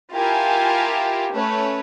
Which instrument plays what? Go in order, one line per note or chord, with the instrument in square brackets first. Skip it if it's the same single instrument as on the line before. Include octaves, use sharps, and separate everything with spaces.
[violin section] E4 F4 G4 A#4 G#5 A5
A3 C#4 B4 C#5